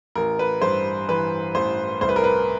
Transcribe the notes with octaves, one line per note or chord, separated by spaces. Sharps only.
A1 A#4
B4
G2 C5
E3 B4
A1 C5
C2 C5
B4
A#4
B4